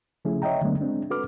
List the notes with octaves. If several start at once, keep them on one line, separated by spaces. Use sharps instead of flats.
C#3 F3 A3 C#4 E4 G#4
C#5 D#5 E5 G5 A#5
D3 F#3 G#3 A3 B3 D4
G#3 C4 D4
F#4 A4 B4 D6 F6